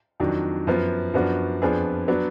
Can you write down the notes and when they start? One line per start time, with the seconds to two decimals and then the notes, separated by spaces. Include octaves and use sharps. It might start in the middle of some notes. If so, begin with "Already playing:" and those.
0.20 F2 D#3 F#3 D4
0.67 F#2 F3 B3
1.14 F#2 F3 B3 D4 F#4
1.62 F2 F3 B3 D4 G#4
2.08 F#3 B3 D4